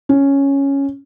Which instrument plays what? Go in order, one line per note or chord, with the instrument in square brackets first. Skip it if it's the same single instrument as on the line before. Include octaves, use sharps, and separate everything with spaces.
[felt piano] C#4